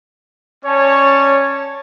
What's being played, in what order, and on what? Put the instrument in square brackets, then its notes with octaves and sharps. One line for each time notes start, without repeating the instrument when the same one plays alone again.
[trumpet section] C#4 C#5 D5 A5